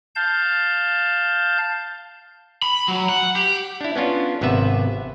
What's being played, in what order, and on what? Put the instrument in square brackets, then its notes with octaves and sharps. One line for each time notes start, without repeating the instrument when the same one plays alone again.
[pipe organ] F5 A5 G6
[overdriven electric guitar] B5
F#3
F#5
G4
[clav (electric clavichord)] D4 E4
B3 C#4 D4 F4
G#1 C3 B3 B4 E5